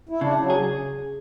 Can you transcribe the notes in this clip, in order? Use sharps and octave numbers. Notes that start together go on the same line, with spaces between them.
E4
C#3 D4
F#3
G#4